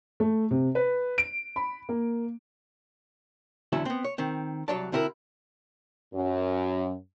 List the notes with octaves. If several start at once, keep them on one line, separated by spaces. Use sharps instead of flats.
A3
C3
B4
D7
B5
A#3
E2 D3 F#3 C#4 E4 E5
B3 C4
C#5
D#3 C4
C2 E3 F#3 C#5 D5 A5
D3 C4 E4 F#4 A#4
F#2